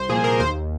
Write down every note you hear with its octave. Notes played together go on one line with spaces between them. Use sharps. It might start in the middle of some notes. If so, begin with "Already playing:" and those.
Already playing: C2 C5
A#2 F3 A#3 G#4
A#4
D#2 C5